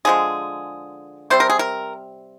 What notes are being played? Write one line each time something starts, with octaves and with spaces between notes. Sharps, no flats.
D3 F3 G#3 G#4
C3 G3 C4 C5
A#4
G#4
A#4